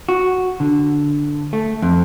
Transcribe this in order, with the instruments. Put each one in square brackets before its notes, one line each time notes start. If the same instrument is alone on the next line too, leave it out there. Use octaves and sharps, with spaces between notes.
[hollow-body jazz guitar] F#4
D3
A3
F2